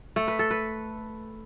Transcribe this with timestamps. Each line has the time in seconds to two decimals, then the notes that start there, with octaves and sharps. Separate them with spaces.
0.16 A3
0.28 B4
0.39 A4
0.51 B4